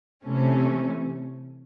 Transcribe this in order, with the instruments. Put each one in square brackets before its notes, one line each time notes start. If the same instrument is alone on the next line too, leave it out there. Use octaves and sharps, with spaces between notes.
[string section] C3 E3 A3 C#4